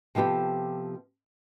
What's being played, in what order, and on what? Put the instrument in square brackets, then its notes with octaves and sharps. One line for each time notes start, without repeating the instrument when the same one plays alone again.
[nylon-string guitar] C3 F3 B3 G4 A4